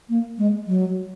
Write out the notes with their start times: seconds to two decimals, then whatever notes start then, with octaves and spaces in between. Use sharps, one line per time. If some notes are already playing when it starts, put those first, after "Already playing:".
0.09 A#3
0.38 G#3
0.67 F#3